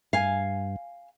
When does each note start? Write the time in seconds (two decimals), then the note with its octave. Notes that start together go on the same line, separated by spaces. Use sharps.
0.13 G2 F5 G#5